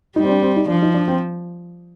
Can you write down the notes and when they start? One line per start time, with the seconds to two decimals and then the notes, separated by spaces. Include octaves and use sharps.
0.16 G3 D#4
0.24 C4
0.29 D4
0.42 C4
0.56 D#4
0.68 F3 D4
0.82 D#4
0.94 D4
1.08 C4